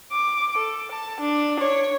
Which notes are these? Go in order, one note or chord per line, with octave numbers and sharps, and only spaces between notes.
D6
A4
A5
D4
C#5